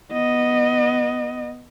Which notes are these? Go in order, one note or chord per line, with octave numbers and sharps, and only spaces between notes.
B3 D#5